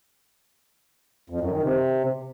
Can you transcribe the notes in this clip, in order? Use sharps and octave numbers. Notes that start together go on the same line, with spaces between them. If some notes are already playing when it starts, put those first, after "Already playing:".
F2
F#2
D#3
C3